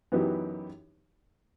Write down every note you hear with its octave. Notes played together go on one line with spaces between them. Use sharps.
F#2 E3 B3 D#4 G4